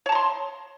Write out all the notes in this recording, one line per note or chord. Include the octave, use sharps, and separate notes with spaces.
C#5 A5 A#5 C6